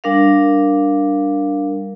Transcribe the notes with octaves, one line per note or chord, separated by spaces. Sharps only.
G3 D4 A#4 F5